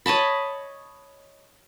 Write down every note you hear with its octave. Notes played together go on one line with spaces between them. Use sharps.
C#5 D#5 A5 B5